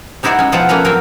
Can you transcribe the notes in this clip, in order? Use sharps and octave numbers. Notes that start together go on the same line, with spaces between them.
G3 D#4 E4 F#4 C5 D5
G#3 C#4
B2 F3 F4 C5 F#5 G5
A3 A#3 C#4 B4 A#5
F#3 C4 A#4